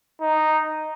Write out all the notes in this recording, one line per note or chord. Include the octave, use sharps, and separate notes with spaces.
D#4